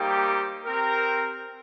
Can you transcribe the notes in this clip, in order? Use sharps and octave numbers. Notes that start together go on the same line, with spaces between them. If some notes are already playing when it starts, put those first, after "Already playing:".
Already playing: G3 A#3 D#4 G4 C5
C4 G4 A#4